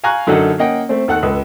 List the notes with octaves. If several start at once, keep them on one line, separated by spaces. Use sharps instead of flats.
F5 G#5 A#5 C#6 F#6
F#2 D3 F#3 D#4 A4 F#5
A#3 C#4 D#5 F#5 G5
A3 C4
D#2 A4 F#5 F#6
C#2 A4 B4